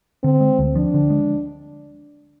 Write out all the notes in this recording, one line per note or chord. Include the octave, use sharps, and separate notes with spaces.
D3 C4
G#3
D2
F3 D4
D3
G#3